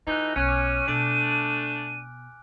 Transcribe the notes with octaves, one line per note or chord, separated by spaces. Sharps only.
E3 A3 D#4 F4 F#6 G6
B1 C#4 G#5 F#6 D#7
D6 F6
B2 A3 D4 D7